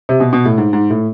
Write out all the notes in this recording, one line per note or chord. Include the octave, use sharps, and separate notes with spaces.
C3
B2
B2
A2
G#2
G#2
A2